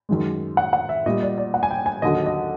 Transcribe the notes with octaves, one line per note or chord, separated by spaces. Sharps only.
F#2 D#3 G#3
F#5
F#5
E5
A#2 G3 D#5
D5
D5
F#5
G#5
G5
G#5
D#2 D3 F#3 D#5
D#5